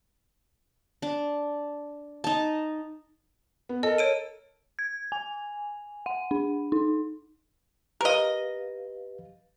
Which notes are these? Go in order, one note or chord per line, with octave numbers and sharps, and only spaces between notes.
D4
D#4 A5
B3
A4 A#4 D#5
C#5 D7 D#7
G#6
G#5
F#5
D4
D#4
G4 A#4 B4 D#5 F5